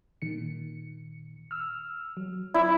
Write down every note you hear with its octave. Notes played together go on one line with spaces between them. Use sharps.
A#2 D#3 C#7
E6 F6
F#3
E4 D5